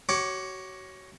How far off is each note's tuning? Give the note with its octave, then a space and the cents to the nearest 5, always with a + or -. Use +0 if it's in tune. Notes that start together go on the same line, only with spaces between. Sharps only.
F#4 +30 C#5 +0 D6 +0